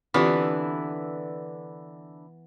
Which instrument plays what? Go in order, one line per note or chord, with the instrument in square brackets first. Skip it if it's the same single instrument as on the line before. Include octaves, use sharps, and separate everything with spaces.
[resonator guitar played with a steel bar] D3 D4 E4 [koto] E3 B3 [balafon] C4 F4 G4